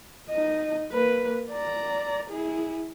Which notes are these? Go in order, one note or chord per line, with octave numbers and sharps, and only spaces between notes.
D#4 D#5
A#3 B4
D5 A#5
E4 G#4